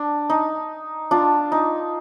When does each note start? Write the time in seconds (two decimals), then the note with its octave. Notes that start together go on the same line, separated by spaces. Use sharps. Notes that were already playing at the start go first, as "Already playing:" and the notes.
Already playing: D4
0.30 D#4
1.11 D4 F4
1.52 D#4